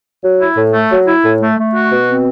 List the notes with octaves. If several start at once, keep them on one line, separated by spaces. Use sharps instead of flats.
F#3
E4
A2
A3
F#3
E4
A2
A3
A3
F#4
B2
C4